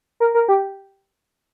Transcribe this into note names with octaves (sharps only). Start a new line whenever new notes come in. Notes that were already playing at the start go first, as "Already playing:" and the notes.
A#4
A#4
G4